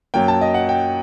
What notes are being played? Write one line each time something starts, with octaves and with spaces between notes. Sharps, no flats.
F#2 F#3 A#3 G5
A5
D#5
F#5
G5